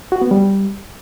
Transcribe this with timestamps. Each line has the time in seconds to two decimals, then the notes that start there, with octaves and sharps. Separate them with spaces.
0.12 F#4
0.22 B3
0.31 G3